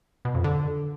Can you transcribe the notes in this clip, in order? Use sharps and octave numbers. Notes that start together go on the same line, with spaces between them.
B2
F2
D3